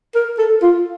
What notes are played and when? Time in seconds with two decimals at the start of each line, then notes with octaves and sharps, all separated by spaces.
0.15 A#4
0.38 A4
0.62 F4